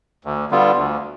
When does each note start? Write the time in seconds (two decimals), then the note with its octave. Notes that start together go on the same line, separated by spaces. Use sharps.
0.25 D2
0.51 D3 G3 B3 F4
0.77 D2